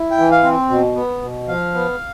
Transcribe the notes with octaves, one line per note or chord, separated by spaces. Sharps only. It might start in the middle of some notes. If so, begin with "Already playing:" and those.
Already playing: E4
G5
E3
F5
C4
B2
B3
B2
F3 F5
B3